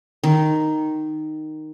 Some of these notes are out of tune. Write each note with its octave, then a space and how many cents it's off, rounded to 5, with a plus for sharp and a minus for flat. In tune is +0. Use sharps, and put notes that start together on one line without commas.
D#3 -5